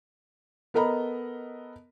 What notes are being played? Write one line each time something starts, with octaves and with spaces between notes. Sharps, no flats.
B3 A4 A#4 D#5 A#5 B5